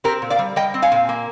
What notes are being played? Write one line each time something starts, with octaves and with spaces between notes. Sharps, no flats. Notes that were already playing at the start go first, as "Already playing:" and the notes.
C4 G4 A#4
A#2
D5 F5
G3
G3 D#5 G5
C4
F5 G#5
A#2
A#3